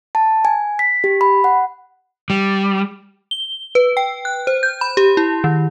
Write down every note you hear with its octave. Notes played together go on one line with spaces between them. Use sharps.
A5
G#5
B6
G4
B5
F#5
G3
G7
B4
G5
F#6
C5
G6
B5
G4
E4
D#3